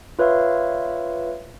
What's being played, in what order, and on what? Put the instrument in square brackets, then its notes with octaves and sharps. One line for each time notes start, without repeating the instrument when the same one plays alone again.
[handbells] F4 B4 C#5 E5 F5